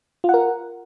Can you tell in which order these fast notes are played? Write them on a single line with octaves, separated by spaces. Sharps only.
F4 F#5 A#4